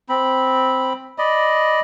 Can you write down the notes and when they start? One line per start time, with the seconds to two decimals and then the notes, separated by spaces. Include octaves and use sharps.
0.09 C4 B5
1.18 D5 D#5 B5